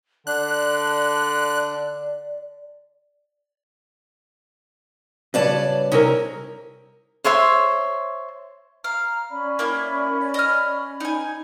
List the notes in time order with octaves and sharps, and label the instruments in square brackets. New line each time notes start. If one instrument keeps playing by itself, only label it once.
[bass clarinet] D3 [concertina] D4 [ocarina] D5 [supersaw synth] F#6
[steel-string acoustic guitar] A2 D5 A5 [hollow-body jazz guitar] C#3 G3 [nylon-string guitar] F#4 B4 C#5
[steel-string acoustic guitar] C3 C#4 [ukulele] D#4 E4 A#4
[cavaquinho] C5 C#5 E5 C6
[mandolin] F5 [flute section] A#5
[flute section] C#4 D5 B5
[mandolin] A#3 E4
D#5 F6
D#4 G#5